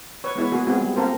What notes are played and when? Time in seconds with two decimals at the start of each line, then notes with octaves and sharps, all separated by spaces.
0.24 B4 C#5
0.36 G#3 B3 E4 C#5
0.52 A#3 B3 F#4 G#4
0.67 G#3 B3 C4 F4 F#4 G#4
0.81 G3
0.96 A#3 C4 F4 A4 A#4 C5